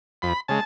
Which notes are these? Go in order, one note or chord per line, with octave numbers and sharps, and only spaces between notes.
F2 B5
C#3 G#3 A5